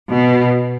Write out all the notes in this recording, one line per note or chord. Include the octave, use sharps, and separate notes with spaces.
B2